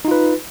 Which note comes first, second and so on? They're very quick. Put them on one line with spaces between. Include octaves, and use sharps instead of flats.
D#4 F4 B4